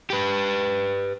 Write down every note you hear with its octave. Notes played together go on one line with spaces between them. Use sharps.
G4 B4